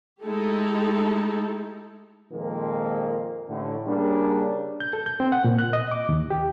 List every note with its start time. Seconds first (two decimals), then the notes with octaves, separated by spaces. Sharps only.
0.23 G#3 A3 D#4 E4 G4 A4
2.32 F2 A#2 D#3 F3 G#3 A#3
3.49 A1 A2 D3
3.87 C#3 G3 A#3 D4
4.80 G6
4.93 A4
5.06 G6
5.20 C4
5.32 F#5
5.44 A#2
5.59 F#6
5.73 D#5
5.91 D6
6.09 D#2
6.30 G4